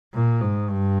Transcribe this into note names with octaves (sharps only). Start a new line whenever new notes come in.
A#2
G#2
G2